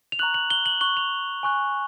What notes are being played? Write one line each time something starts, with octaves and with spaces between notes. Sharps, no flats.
F7
A#5 C#6 F#6 F#7
F#7
G7
F#7
C#6 F#6 G7
F7
G#5 C#6 F#6